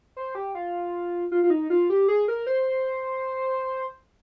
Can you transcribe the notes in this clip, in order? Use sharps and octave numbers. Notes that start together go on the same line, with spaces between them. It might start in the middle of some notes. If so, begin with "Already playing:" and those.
C5
G4
F4
F4
F4
D#4
F4
G4
G#4
A#4
C5